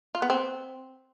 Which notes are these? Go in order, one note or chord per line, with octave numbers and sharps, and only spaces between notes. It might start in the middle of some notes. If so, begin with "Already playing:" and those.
F4
B3
C4